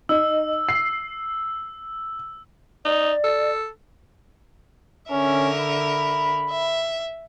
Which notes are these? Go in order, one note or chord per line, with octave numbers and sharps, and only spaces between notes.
D#4 E6
C7
D#4 D5
A4
D3 C#4 A#4 E5
B5
E5